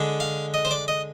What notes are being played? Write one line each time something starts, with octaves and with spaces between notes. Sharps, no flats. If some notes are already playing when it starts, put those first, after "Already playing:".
Already playing: D3 G#3 D4
F5
D#5
C5
D5
D#5